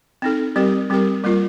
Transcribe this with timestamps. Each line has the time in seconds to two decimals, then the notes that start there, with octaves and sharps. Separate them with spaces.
0.22 C4 D#4 A4
0.56 G3 C4 G4 A#4
0.90 G3 C4 G4 A#4
1.24 G3 A#3 F4 A#4